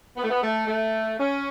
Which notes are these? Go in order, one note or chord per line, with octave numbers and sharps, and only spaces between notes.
B3
A3
B3
A3
A3
C#4